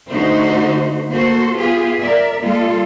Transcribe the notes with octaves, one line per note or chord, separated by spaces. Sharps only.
D3 A3 D#4 F#4 C5
A#3 F#4 A4 C5
B3 F4 G4 G#4
A#4 D5 E5
G3 G#3 A#3 F4 A4